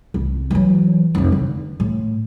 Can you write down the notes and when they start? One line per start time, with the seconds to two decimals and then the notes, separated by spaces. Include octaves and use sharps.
0.14 C2
0.51 E3 F#3
1.15 F1 F2
1.32 D3
1.80 A2